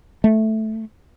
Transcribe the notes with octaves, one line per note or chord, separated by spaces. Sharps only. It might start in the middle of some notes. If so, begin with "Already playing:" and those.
A3